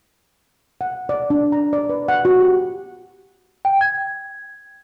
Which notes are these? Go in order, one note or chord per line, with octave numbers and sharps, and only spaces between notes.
F#5
D5
D4
A#5
D5
B4
F#5
F#4
G4
G5
G#6